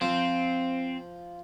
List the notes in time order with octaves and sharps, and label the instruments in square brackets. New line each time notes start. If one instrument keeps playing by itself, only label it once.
[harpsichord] F3 [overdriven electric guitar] C4